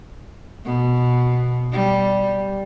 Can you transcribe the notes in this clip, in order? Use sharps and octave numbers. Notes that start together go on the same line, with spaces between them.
B2
G3